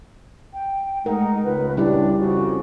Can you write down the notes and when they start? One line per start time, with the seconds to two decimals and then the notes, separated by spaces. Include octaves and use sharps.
0.54 G5
1.06 G#3 A3 D#4 A#4 F#5
1.44 C#2 B4
1.77 G3 D4 E4 G4
2.20 F2 C#3 F#4